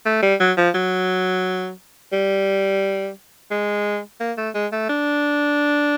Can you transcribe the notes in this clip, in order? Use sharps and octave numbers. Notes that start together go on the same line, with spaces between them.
A3
G3
F#3
F3
F#3
G3
G#3
A#3
A3
G#3
A3
D4